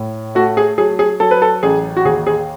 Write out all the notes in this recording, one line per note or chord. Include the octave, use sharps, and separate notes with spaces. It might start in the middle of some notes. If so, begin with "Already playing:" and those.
Already playing: A2
A3 F#4
G#4
F#3 G#4
G#4
F#3 A4
B4
A4
A1 G#4
F#4
D#2 G#4
G#4